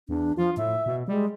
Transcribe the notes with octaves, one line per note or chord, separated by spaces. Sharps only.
E2 D4
F3 F4
A2 E5
B2
G3 G#3